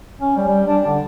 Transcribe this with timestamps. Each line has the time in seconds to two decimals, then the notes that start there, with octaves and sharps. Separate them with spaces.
0.21 C#4
0.37 G3
0.48 G3
0.68 D4
0.87 D3